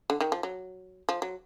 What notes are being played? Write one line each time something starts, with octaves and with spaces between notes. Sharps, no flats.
D3
D#3
F3
F#3
F3
F#3